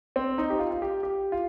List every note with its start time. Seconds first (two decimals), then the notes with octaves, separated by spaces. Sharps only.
0.16 C4
0.38 D#4
0.50 G4
0.59 F4
0.71 F4
0.82 G4
1.03 G4
1.32 F4